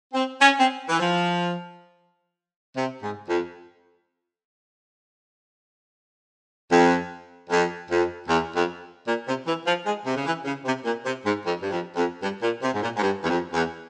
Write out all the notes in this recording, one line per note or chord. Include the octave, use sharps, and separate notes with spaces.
C4
C#4
C4
E3
F3
C3
G#2
F2
F2
F2
F2
E2
F2
A#2
C3
E3
F3
G#3
C3
C#3
E3
C#3
C3
A#2
C3
G#2
F2
G2
F2
F2
G2
A#2
C3
G#2
A#2
G#2
G2
E2
F2
E2